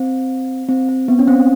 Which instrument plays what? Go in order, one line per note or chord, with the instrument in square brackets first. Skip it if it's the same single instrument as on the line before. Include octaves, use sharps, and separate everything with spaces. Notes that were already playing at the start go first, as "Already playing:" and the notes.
Already playing: [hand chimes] C4
C4
C4
B3
C#4
C4